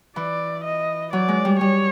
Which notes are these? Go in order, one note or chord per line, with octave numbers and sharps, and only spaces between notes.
E3 D5
D#5
F#3 D5
G#3
G3
G3 C#5